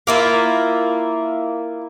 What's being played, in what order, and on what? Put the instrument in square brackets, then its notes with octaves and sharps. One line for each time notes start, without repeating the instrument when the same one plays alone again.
[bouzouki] A#3 E4 F4